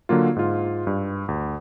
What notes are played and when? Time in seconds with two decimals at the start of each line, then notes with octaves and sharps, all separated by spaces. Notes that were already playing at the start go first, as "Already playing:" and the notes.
0.09 D3 F#3 A#3 F4
0.36 G#2 F4
0.87 G2
1.28 D2